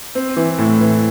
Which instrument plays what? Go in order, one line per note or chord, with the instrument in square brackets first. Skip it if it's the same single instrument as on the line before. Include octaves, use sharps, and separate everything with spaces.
[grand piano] C4
E3
A2
E3